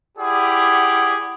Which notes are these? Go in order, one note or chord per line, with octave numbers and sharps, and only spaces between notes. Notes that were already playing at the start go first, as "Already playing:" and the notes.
E4 G4 G#4 D5 F#5